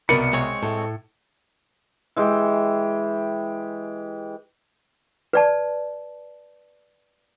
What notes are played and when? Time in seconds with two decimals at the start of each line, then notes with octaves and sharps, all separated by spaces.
0.09 C2 B2 A#4 D5 B5 C#7 D#7
0.33 G#3 C4 C#5
0.63 A2 A4
2.16 E3 G#3 G4
5.33 B4 D5 A5